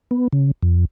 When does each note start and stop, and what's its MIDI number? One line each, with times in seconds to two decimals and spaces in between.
0.11 0.28 59
0.33 0.51 49
0.63 0.85 41